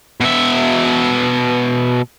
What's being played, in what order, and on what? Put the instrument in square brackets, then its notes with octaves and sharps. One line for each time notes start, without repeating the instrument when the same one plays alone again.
[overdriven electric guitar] B2 E5